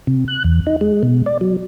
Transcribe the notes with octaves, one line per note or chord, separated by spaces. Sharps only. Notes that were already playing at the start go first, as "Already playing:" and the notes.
C3
F#6
E2
D#4
G#3
B2
D5
F#3